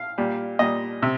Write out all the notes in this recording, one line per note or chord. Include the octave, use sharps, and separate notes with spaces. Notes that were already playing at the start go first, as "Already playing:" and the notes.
Already playing: F5
A#2 G3
A#2 G3 D#5
C3